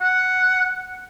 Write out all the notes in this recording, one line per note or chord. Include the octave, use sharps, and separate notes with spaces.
F#5